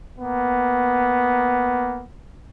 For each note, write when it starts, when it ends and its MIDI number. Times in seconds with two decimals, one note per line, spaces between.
0.19 2.03 58
0.19 2.03 59